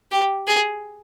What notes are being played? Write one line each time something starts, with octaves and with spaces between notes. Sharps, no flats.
G4
G#4